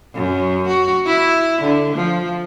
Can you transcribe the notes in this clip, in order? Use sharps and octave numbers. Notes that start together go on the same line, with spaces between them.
F#2
F#4
E4
D3
F3